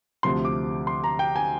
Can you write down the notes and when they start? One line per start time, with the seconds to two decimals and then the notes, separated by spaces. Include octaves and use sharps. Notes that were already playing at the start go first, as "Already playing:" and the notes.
0.23 D2 C3 F3 C6
0.45 D6
0.87 C6
1.04 A#5
1.19 G5
1.36 G#5